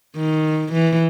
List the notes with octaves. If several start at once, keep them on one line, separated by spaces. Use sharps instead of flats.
D#3
E3